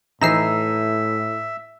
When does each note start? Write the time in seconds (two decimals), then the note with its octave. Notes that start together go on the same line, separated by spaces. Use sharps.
0.22 A2 E3 D#4 E5 A#5 E6 C7